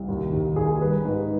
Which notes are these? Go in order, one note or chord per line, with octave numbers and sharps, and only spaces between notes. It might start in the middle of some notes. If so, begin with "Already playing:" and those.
Already playing: C2
D#2
D#2
D#2 G#4
G3 B4
G#2